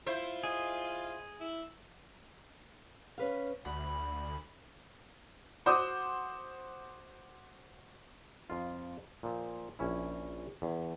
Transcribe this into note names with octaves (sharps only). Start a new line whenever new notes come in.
E4 F4 C5
G#4 D#5
E4
C#4 B4 F5
D2 F#4 B5
F#4 C5 F#5 D6 D#6
F2 F4
A#2 F3
A#1 C#4 E4
E2